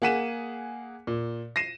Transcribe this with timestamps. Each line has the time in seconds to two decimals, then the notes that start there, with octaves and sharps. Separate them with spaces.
0.02 A#3 G#4 F#5 B6 D#7 E7
1.07 A#2
1.56 A#6 C7 D#7 E7